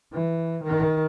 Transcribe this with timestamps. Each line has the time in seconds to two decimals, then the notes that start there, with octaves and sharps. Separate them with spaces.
0.13 E3
0.64 D#3